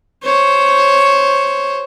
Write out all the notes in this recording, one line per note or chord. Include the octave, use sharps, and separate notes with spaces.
C5 C#5